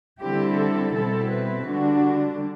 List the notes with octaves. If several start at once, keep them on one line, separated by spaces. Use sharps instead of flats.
D3 G3 C4 E4 G4
A4
B2 G3 C4 E4 A4
B4
D3 G3 D4 F#4